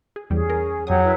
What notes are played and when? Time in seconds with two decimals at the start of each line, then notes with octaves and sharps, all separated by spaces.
0.16 G#4
0.30 E2 G3 C#4 G#4
0.50 A#4
0.87 F2 F#3 G4 G#4 F#5 G#5 D#6
1.03 E4 A#4 B4